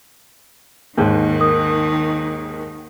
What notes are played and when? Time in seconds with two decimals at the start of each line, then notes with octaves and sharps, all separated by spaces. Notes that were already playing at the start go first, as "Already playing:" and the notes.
0.97 D#2 G#2 D#3
1.40 A#4 D#6